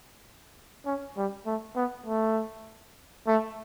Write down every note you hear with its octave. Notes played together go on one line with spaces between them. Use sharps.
C#4
G3
A3
B3
A3
A3